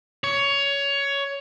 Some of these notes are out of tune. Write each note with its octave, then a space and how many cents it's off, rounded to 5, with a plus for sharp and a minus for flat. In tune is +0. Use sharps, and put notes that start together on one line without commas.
C#5 +15